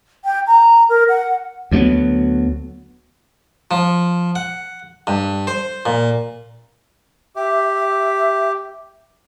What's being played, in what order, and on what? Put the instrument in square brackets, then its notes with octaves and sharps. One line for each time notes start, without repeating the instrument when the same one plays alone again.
[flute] G5
A#5
A#4
F#5
[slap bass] D2 F#3 G#3 B3
[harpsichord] F3
F#5
G2
C5
A#2
[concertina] G4 [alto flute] E5